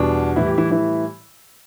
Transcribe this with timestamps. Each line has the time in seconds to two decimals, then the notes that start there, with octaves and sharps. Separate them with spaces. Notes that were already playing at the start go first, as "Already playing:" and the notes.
Already playing: E2 B2 G3 D4
0.36 A2 E3 G3 E4
0.47 G4
0.58 E3 E4
0.71 E3 E4